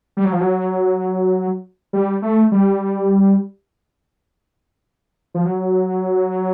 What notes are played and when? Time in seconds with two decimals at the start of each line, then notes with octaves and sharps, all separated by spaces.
0.17 G3
0.25 F#3
0.33 F3
0.41 F#3
1.93 G3
2.22 A3
2.52 G3
5.34 F3
5.45 F#3